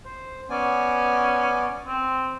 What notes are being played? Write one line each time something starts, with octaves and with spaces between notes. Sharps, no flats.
C5
B3 C#4 D5 G#5
C4